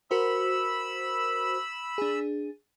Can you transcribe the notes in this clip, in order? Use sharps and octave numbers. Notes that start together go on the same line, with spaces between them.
F#4 A#4 C5 B5 E6
D4 G#4